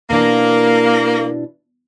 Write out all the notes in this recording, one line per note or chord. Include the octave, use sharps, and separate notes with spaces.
B2 E3 A#3 D4